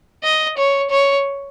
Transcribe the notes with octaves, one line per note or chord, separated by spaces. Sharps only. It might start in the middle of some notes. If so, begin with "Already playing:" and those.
D#5
C#5
C#5